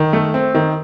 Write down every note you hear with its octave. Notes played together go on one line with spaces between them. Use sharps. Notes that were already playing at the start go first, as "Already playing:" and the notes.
Already playing: D#3
A3
C4
D#3